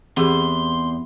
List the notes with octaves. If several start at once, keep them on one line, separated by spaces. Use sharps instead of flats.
E2 C4 G4 G#4 C6